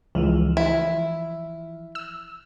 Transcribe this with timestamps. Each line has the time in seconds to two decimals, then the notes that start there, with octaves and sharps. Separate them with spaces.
0.15 C#2 E3 F3
0.57 E4
1.95 E6